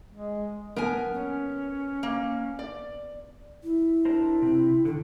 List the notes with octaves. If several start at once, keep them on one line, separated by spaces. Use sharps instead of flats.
G#3
B3 A#4 G#5
C#4
A#3
D5
E4
D4 A#4 C5
C3 C4
D3 D#3 A4